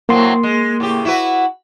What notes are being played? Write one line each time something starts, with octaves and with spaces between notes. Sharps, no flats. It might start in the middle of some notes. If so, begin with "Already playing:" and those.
A2 F#3 A#3 C4 C6
G#3
A2 C#3 G4
E4 F#4 B4